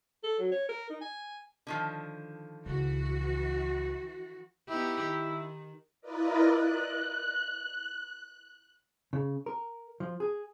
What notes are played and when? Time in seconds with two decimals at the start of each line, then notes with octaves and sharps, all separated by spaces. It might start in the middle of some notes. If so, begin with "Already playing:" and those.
0.24 A4
0.39 F#3
0.52 C#5
0.69 A#4
0.90 D#4
1.01 G#5
1.67 D3 D#3 F3
2.66 C#2 E3 F#4
4.69 B3 D#4 E4 G4
5.03 D#3
6.01 E4 F4 A#4 B4 D5 D#5
6.45 F#6
9.13 C#3
9.46 A#4
10.00 F3
10.20 G#4